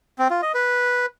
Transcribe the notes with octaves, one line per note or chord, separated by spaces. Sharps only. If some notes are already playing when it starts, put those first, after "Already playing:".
C4
F4
D#5
B4